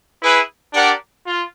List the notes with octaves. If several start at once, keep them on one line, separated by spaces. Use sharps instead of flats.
E4 G#4 B4
D4 G4 A#4 D5 F#5
F4